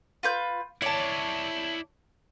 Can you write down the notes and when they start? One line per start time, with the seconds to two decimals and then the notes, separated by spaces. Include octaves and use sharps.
0.23 F4 B4 G6
0.82 E4 C#5 D5 A5